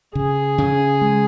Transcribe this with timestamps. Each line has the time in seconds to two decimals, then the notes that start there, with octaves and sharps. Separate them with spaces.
0.15 C#3 G#4
0.58 C#3
1.01 G#3